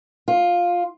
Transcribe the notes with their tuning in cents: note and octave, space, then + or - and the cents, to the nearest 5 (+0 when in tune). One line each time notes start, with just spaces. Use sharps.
F4 +10